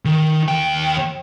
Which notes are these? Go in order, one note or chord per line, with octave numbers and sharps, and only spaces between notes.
D#3
D#2 G5